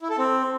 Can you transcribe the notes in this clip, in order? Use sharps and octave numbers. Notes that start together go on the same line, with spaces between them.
E4
A4
C4